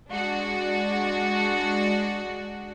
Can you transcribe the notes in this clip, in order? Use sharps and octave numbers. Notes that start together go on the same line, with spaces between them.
G#3 D4 F#4